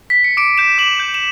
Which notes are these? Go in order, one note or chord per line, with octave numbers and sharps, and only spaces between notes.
B6
C#7
D6 D7
G6 E7
D6 F#7
G6
E7